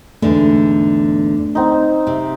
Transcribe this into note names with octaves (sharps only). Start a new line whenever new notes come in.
E2 G#2 D3 A3
C4 D#4
C3